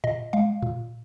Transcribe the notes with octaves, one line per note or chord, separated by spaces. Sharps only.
A#2 D#5
G#3 F5
A#2